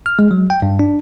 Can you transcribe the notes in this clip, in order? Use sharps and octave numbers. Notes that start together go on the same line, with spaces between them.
F6
G#3
F#3
G5
G2
D4